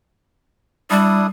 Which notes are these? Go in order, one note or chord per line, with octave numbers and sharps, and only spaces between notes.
G3 D4 E4 D#6